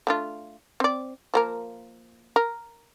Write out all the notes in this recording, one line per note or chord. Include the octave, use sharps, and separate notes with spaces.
A3 D4 F4
C4 D5
F3 A#3 A#4
A#4